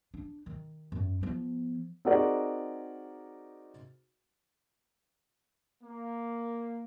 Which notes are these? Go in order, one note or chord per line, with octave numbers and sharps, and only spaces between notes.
D4
D#3
F#2
F3 B3
C4 D#4 F#4 G#4 A#4 D5
A#3